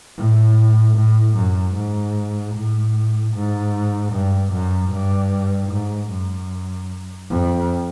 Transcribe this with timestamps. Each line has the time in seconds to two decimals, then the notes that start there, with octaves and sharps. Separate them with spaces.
0.17 A2
0.96 A2
1.36 F#2
1.76 G#2
2.55 A2
3.34 G#2
4.13 G2
4.53 F#2
4.93 G2
5.72 G#2
6.11 F#2
7.30 F2